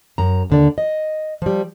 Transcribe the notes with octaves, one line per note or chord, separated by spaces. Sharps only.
F#2 A#5
D#2 D3 D5
D#5
F3 G3